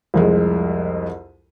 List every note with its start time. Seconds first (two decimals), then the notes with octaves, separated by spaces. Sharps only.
0.14 C2 F2 G#3